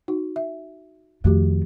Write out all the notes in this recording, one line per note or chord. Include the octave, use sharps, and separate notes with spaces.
D#4 F#4
E5
F2 D#3 A3 F#4 G4